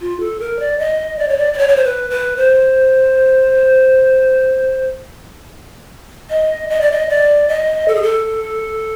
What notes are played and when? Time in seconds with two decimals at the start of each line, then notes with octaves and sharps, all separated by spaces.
0.01 F4
0.20 A4
0.40 A#4
0.59 D5
0.79 D#5
1.19 D5
1.28 C#5
1.38 D5
1.54 D5
1.58 C#5
1.68 C#5
1.76 C5
1.84 B4
2.10 B4
2.37 C5
6.30 D#5
6.69 D#5
6.81 D5
6.92 D#5
7.09 D5
7.48 D#5
7.88 A4
7.95 G#4
8.02 A4